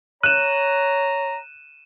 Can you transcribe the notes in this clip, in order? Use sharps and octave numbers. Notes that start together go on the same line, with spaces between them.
C#5 A#5 F#6 D#7 E7